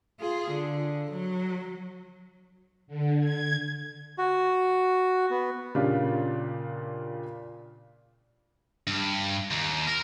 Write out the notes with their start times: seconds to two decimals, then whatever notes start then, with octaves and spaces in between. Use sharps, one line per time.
0.20 F4 G#4
0.51 D3
1.10 F#3
2.87 D3
3.19 G#6
4.18 F#4
5.31 B3
5.75 A#2 C#3 D4 F4 G4
8.87 G2
9.51 D#2
9.87 A#4